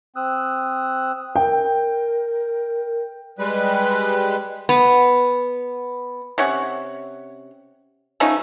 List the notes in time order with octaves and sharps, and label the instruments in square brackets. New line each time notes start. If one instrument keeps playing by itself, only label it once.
[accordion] C4 D#6 E6 F#6
[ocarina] A#4 [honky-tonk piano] G5
[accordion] G3 G#3 B4
[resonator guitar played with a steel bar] B3
[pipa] C3 C#4 C#5 F#5
F3 A3 C#4 D#4